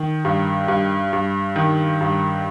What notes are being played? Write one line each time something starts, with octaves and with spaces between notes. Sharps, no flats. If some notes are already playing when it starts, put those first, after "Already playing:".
Already playing: D#3
G2
G2
G2
D#3
G2